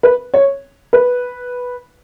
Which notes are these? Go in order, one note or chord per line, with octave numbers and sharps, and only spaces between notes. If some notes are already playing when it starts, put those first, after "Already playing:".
B4
C#5
B4